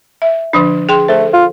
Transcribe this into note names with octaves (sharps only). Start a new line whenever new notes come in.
E5
D3 F3 D4
G#4 G5 C6
A3 A4 C5
F4